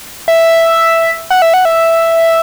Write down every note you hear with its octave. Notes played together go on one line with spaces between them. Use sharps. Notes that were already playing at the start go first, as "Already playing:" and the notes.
E5
F#5
E5
F#5
E5